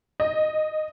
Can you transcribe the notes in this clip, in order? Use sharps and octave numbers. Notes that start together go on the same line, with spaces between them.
D#5